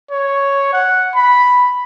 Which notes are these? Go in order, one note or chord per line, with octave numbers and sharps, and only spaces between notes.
C#5
F#5
B5